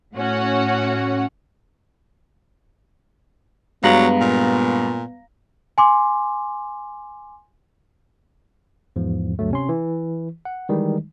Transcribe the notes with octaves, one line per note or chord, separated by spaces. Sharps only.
A2 C#4 F#4 F#5
G2 F#3 G#3 B3 F5 A#5 A#6 F#7
A#2
G#5 C6 D6
E2 G#2 F3
D2 G2 F#3 A3
C3 C#4 C6
E3
F#5
D#3 E3 G3 G#3 D#4